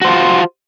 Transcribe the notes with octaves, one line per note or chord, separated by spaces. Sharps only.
F4 F#4 C5